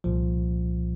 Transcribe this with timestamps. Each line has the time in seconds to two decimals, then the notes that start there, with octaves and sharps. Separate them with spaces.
0.04 C2 A#2 F3